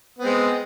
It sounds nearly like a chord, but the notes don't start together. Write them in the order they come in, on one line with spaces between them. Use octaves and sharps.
B3 C4 G#3